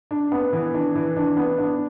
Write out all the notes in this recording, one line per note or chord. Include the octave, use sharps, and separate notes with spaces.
D4
B3
E3
D4
E3
D4
B3
D4